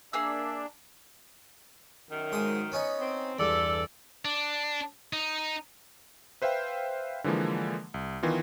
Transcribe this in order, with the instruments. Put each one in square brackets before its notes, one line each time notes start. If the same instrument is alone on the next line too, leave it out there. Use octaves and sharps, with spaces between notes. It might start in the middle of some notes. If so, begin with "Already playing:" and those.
[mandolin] A#3 G#4 E6 [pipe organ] D4 [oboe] E5
[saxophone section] F#2 D#3
[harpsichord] G#2 C6 D#6
B3 C#4 D#4
[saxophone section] C4
[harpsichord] E2 G2 [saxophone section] A4 D5
[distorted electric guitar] D4
D#4
[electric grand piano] B4 C5 E5 F5 G5
D3 E3 F3 G#3 A#3
C2
D#3 E3 B3 F4